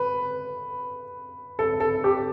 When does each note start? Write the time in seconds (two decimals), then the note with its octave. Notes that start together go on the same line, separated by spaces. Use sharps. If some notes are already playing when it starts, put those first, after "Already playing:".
Already playing: B4
1.59 A4
1.80 A4
2.04 G4